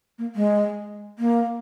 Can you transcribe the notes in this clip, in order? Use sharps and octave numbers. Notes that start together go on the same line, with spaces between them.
A#3
G#3
A#3